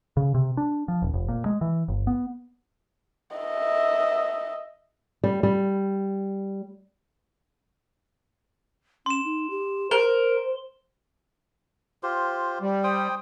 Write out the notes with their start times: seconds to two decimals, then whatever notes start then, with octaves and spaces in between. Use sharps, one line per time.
0.17 C#3
0.34 C3
0.57 D4
0.88 F3
1.02 D#1
1.14 F1
1.29 A#2
1.46 G#3
1.61 E3
1.88 G1
2.07 B3
3.37 D#5 E5
5.24 G3
5.43 G3
9.06 C#4 C6 E7
9.25 D#4
9.50 G4
9.91 A#4 C5 G7
12.03 F4 G4 C5
12.61 G3
12.84 C5 G5 D#6